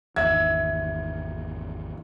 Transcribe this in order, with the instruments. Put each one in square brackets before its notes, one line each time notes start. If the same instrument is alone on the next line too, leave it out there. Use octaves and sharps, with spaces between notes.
[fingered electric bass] G#1 E2 D#3 [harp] E5 [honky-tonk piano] G#6